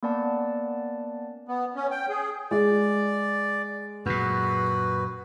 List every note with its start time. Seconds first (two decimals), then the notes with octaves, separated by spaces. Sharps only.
0.03 A#3 B3 C#4 D5 F#5 A5
1.48 B3
1.76 C#4
1.91 G5
2.09 G#4
2.51 G#3 D5
4.06 F#2 A#2 F#4 B4